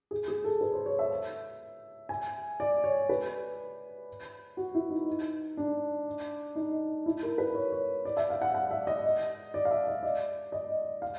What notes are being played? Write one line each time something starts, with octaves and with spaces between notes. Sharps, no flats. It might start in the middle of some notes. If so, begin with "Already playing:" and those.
G#4
G#4
A4
B4
C5
C#5
E5
G#5
D5
C#5
B4
F#4
E4
D#4
D4
D#4
E4
A#4
B4
C#5
C#5
D5
E5
F5
F#5
F#5
E5
D#5
D5
F5
E5
D#5
D5
D#5
F5